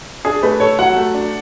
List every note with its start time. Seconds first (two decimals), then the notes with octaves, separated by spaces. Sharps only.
0.25 D4 G#4
0.43 A3 B4
0.60 A4 C#5
0.79 F#3 F#5
0.96 A3
1.15 D4